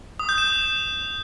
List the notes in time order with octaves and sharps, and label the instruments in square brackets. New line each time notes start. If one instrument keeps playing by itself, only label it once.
[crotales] D#6
G6
E7